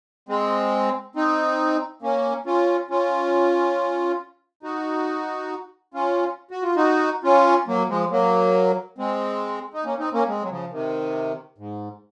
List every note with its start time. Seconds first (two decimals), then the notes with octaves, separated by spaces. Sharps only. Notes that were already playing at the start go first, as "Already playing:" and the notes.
0.29 G#3 C4
1.15 C4 D#4
2.02 A#3 C#4
2.46 C#4 F4
2.90 C#4 F4
4.63 D#4 F#4
5.94 C#4 F4
6.51 F#4
6.63 F4
6.76 D#4 F#4
7.24 C#4 F4
7.67 F#3 A#3
7.89 F3 G#3
8.11 F#3 A#3
8.98 G#3 C4
9.74 D#4
9.84 A#3 C#4
9.99 C4 D#4
10.13 A#3 C#4
10.28 G#3 C4
10.42 F#3
10.50 C#3 F3
10.72 C3 D#3
11.58 G#2